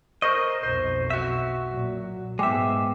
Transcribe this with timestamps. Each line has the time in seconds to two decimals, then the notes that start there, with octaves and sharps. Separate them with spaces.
0.22 A#4 C5 D#5 C#6 A#6
0.63 B1 F2 C5
1.10 F#4 E5
1.69 A#2 F#3
2.39 G#2 G#3 B3 E5 G5 D6